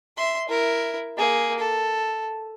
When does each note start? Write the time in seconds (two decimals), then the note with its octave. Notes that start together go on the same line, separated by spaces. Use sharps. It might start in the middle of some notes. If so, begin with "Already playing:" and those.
0.17 E5 C6
0.49 E4 A#4
1.17 A#3 G#4
1.59 A4